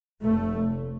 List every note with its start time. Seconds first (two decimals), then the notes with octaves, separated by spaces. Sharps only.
0.22 F1 A3